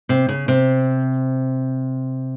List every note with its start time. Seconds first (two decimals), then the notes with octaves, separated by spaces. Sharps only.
0.09 C3
0.29 C#3
0.48 C3